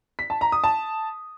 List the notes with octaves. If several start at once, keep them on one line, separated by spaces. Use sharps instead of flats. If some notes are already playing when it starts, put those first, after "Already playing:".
B6
A5
A#5
D#6
A5